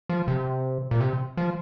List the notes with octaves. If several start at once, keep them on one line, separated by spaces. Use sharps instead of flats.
F3
C3
A#2
C3
F3